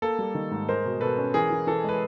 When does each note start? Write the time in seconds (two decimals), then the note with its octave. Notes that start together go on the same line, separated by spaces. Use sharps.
0.02 A#3 A4
0.19 G3
0.35 D#3
0.51 G#2
0.68 G#3 A#4 C5
0.85 B2
1.01 B2 A4 B4
1.18 C#4
1.34 E3 G#4 A#4
1.50 E3
1.67 E3 A4
1.84 G#3 B4